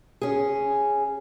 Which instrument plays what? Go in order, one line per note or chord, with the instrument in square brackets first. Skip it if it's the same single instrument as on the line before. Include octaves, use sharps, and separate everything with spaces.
[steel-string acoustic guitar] C#4 G#4